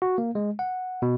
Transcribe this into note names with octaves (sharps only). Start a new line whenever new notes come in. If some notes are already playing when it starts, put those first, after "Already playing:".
F#4
A#3
G#3
F#5
B2